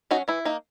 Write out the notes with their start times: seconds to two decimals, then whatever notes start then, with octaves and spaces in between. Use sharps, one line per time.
0.11 F#3 C#4 D#4 F#4
0.28 E3 E4
0.45 A#3 D#4